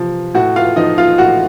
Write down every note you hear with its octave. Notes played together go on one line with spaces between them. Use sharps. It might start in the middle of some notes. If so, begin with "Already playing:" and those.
Already playing: C3 F3
A2 F#4 F#5
F4 F5
F3 D#4 D#5
F4 F5
A2 F#4 F#5